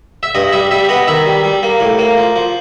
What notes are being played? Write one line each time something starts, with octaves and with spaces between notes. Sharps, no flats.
E5
G2 D#5
G3 E5
G3 E5
B3 D#5
D#3 E5
G3
G3
A#3
A2
A#3
F3
F3